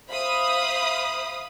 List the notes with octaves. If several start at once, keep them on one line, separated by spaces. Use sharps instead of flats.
C5 E5 F5 B5 D#6